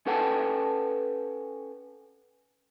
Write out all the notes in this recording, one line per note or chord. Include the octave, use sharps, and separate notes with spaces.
C#4 A4 B4 F#5 G5 A5